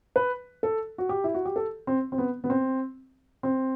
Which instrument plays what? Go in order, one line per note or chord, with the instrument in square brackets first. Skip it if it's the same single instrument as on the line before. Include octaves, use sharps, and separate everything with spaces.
[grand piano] B4
A4
F#4
G4
E4
F#4
G4
A4
C4
C4
B3
B3
C4
C4